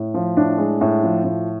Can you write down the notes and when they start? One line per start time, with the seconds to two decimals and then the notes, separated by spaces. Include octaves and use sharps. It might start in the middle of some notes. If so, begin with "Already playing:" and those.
Already playing: A2
0.14 F3
0.37 A2 D4
0.58 G#3
0.81 A2
1.03 F3
1.24 A2